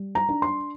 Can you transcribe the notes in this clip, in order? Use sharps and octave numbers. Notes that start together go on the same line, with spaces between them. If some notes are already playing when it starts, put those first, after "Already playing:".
Already playing: G3
A#5
D4
C6